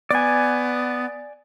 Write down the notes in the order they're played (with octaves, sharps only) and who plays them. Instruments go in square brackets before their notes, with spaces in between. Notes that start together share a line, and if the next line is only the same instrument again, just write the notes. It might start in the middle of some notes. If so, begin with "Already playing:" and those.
[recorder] B3 [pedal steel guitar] D5 G#5